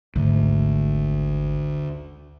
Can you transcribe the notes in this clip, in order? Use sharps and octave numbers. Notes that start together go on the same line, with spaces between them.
G#1 D2